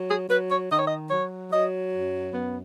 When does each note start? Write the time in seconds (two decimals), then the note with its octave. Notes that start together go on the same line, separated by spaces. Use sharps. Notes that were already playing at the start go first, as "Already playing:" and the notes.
Already playing: F#3
0.09 G#4
0.29 F#3 B4
0.51 C#5
0.71 D#3 D#5
0.78 C#5
0.87 D#5
1.10 F#3 C#5
1.52 F#3 D#5
1.92 F#2
2.32 F#2 B3